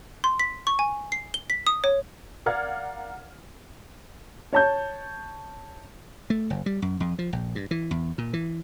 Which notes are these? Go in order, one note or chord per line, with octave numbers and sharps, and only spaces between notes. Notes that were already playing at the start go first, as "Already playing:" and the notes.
C6
B6
C#6
G#5
C7
G7
B6
D#6
C#5
A#4 D5 F5 F#5 F6 G#6
C#5 A5 G6
A3
F#1
G3
F#2
F2
F3
A#1
G2
E3
E2
A#2
E3